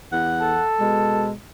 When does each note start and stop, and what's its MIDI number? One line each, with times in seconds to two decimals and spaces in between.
0.12 0.63 40
0.12 0.63 78
0.41 1.26 69
0.80 1.34 47
0.80 1.34 56